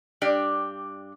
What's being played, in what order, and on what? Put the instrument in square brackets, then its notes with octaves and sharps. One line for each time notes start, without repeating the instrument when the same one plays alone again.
[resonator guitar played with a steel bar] G2 D4 G4 D5